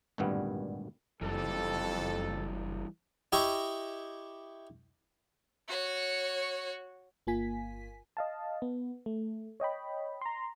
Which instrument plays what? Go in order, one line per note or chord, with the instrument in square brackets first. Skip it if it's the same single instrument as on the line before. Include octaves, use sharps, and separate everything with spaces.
[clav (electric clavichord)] G#1 D2 G2 A#2 G3 B3
[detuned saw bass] F#1 [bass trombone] F2 [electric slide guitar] E3 G3 [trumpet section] A4
[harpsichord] E4 G4 D#5 E5 C#6
[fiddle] F#4 C#5
[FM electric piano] G1 A#3 F4 G#5 B6
D#5 F5 A5
B3
A3
C#5 D#5 G5 B5
A#5 C6